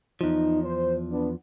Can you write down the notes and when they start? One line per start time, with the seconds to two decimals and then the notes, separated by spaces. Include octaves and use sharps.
0.21 E2 F3 D#4
0.63 C5
1.11 B3 D4